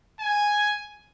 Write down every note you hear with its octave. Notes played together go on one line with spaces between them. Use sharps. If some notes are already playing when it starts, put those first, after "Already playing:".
G#5